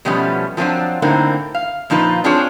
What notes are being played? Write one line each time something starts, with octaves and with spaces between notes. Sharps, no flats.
B2 F3 G3 A3 B3 C#4
F3 F#3 A3 C4 D4 F4
A2 D3 A#3 C4 D#4
F5
A#2 F3 D#4 F4 B4
C4 D4 F4 G#4 C#5